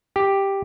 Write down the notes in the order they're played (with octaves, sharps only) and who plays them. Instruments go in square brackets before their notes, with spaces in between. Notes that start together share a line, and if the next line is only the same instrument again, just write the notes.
[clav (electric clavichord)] G4